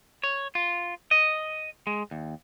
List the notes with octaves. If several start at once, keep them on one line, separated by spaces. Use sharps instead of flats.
C#5
F4
D#5
G#3
D#2